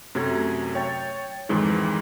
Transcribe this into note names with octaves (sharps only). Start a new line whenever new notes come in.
F#2 C3 F#3 A3 G#6
C#5 G5 C#6 A6
F2 G#2 D#3 E3 G#3